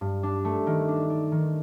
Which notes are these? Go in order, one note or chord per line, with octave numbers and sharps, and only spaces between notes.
G2
D4
A3
D#3
D4
D4
D#3